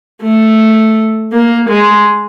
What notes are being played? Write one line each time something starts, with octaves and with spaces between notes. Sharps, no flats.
A3
A#3
G#3